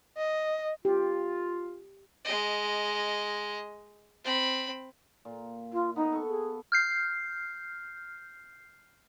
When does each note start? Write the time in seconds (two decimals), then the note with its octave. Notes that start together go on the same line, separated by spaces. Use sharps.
0.17 D#5
0.85 F4 G4
2.25 G#3 D#5
4.24 C4 B5
5.25 A#2
5.73 F4
5.96 B3 D#4
6.13 A4 C#6
6.29 G#4
6.72 F6 G6 C7